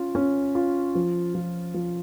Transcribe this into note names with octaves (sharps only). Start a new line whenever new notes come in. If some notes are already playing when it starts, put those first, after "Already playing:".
Already playing: C#4 F4
C#4
F4
F3
F3
F3